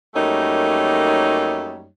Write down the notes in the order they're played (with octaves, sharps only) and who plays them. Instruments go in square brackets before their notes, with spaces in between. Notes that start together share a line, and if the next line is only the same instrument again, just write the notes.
[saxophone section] F#2 G3 A3 A#3 D#4 C#5